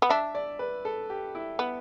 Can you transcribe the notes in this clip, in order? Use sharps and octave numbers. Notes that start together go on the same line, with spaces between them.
B3
D4 E5
D5
B4
A4
G4
E4
B3